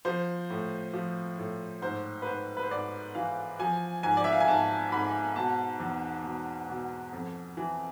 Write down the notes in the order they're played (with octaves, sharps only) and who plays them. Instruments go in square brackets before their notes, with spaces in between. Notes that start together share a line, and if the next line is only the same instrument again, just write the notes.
[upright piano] F3 C5
A2
F3
A2
G#2 C5
B4
G#2 C5
B4
C5
G#2 D5
E3 F5
F3 G#5
G#2 G#5
D5
E5
F5
G#5
G#2 A5
G#2 B5
B2 A5
E2
B2
B2
F2
E3